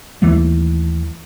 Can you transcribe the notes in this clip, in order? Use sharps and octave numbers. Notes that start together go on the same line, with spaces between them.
D#2 E3 G3 A3